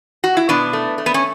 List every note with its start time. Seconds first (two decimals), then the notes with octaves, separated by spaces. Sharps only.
0.24 F#4
0.37 E4
0.49 B2 B3 D4
0.73 A3
0.98 A3
1.06 B3
1.14 C#4